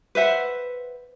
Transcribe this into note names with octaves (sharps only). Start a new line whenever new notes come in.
B4 C5 E5 F#5